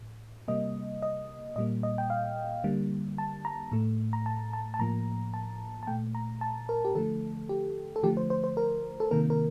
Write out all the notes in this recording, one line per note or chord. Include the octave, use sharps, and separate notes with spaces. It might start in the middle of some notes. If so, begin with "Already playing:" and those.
Already playing: A2
C3 G3 A#3 D#5
D#5
A#2 G3 A#3 D#5
D#5
G5
F5
D3 G3 A#3
A5
A#5
A2 A3
A#5
A5
A5
A5
A2 F3 A#3 A#5
A5
A5
A#2 A3 G5
A#5
A5
A#4
G4
D3 F3 A3 A4
G4
A4
D3 F3 A3 G4
C5
C5
C5
A#4
A4
C3 D#3 A#3 A#4
A#4